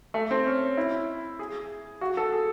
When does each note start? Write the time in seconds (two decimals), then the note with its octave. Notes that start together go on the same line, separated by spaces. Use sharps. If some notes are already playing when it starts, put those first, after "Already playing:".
0.14 A3
0.31 C4
0.46 C#4
0.77 E4
1.39 G#4
2.01 F#4
2.17 A4
2.32 G#4